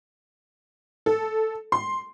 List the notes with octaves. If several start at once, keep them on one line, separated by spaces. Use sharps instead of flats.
A4
C6